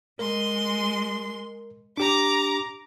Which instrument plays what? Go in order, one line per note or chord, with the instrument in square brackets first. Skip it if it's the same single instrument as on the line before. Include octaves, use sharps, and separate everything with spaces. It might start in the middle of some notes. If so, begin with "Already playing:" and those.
[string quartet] G#3 C6 [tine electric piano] A#4
[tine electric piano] D4 G4 [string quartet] A#5 D6